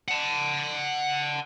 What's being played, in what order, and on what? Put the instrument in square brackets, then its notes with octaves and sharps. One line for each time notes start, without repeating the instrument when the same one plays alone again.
[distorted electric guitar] F#5 A5